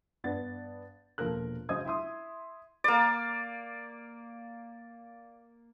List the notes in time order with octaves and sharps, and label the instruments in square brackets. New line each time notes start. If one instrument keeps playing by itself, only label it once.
[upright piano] G2 B3 D5 F#5 A6
E1 A#2 F3 A4 A#4 F#6
C#3 F#3 C5 D#5 D#6 G#6
E4 E5 C6 D#6
[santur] A#3 D5